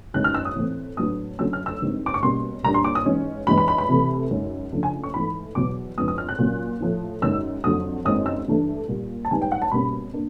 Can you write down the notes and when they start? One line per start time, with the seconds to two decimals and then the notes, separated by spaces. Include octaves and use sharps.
0.14 F#2 D#3 G#3 C#4 F#6
0.24 F6
0.34 E6
0.45 D#6
0.55 A2 E3 A3 C4
0.97 A2 F#3 B3 D4 D#6
1.39 D3 F#3 A3 C#4 E6
1.53 F6
1.66 E6
1.81 G2 D#3 G#3 C4
2.06 D6
2.14 C#6
2.22 B2 G3 A#3 C#4 C6
2.63 A#2 G3 A#3 D4 A#5
2.74 C6
2.84 D6
2.95 D#6
3.05 G#2 E3 G#3 C#4
3.47 G2 E3 G#3 B3 B5
3.58 B5
3.68 B5
3.78 B5
3.89 C3 E3 A3
4.31 F#2 D#3 G#3
4.72 C#3 F3 A3 D4
4.83 G#5
5.04 C#6
5.14 G#2 E3 A3 B5
5.55 E2 B2 F#3 B3 D6
5.98 F2 D3 F3 G#3 B3 D#6
6.08 D#6
6.18 F6
6.29 F#6
6.38 A#2 F#3 A#3 C#4
6.81 A2 F3 A3
7.22 F#2 D#3 G#3 E6
7.64 F2 D3 F#3 D#6
8.05 F#2 D#3 G#3 C4 D#6
8.26 E6
8.48 G2 E3 A3 D4
8.88 A#2 G3 A#3
9.25 A5
9.31 G#2 D#3 G3 B3 G#5
9.41 G5
9.52 F#5
9.62 A5
9.72 B2 G3 A#3 C#4 B5
10.14 A#3 D4